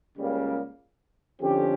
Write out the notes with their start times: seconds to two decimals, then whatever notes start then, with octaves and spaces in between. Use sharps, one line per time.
0.17 C#2 C#3 G3 A#3
1.40 F2 D3 F3 C#4 G4